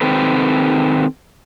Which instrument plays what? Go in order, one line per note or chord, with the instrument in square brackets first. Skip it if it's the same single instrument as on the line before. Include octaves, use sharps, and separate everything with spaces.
[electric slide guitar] D#3 C4 G4 A4 B4